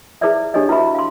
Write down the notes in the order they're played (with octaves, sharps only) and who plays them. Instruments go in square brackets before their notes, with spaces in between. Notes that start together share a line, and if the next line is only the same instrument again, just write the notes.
[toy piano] E4 G#4 B4 C5 D5 E5
D4 G4 A4 C#5 D#5
E4 F#4 B4 E5 B5 C#6
F5 C6